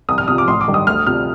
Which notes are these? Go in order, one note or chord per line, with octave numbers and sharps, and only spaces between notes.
C2 D#6
F6
C3 F3 D#6
D6
A1 C6
D6
G2 D#3
D#6
D2 F6
C3 F3 F6